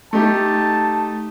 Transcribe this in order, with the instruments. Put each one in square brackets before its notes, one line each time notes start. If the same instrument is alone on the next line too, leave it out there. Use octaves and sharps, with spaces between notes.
[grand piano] A3 D#4 G4 [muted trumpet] A5